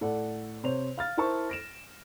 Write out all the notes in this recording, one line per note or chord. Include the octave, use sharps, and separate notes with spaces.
A2 A4 D5 F#5
C3 C5 C#5 F7
F5 F6 A6
E4 A#4 C5 A5 C#6
A#6 D7 E7